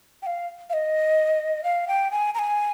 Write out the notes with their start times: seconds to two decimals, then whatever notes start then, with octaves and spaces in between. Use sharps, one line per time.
0.22 G5
0.26 F5
0.70 F5
0.73 D#5
1.64 F5
1.88 G5
2.11 G#5
2.34 A#5
2.39 G#5